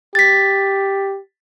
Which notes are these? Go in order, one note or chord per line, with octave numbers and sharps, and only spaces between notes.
G4 A6 B6